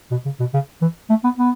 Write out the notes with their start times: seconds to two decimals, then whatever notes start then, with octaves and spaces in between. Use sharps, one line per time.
0.11 B2
0.25 C#3
0.40 B2
0.54 C#3
0.82 E3
1.09 A3
1.24 B3
1.38 B3